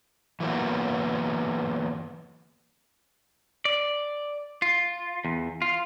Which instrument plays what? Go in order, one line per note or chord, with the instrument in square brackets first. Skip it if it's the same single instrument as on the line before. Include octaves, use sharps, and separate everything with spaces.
[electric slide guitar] E3 F#3 A#3 B3
[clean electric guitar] D5
F4
E2
F4